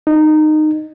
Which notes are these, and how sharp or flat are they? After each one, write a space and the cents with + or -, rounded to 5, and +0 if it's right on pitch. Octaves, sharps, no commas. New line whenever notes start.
D#4 -15